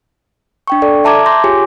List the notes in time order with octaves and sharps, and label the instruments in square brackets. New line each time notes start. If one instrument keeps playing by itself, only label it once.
[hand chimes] D4 G5 C#6
A4 D5
E5 A5 A#5 D6 G#6
C6 D6 G6 A#6
F4 G4 G#4 C#5 G#5